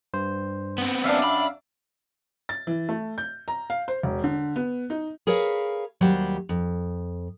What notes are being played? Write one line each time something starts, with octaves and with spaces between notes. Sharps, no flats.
G2 C5
B3 C4
F#2 D4 E5 F5
B5
A6
E3
A3
G6
A#5
F5
C5
E1
D3
B3
D#4
G#4 A#4 B4 C#5 F5
D#2 F#3 G3 G4 C5
F2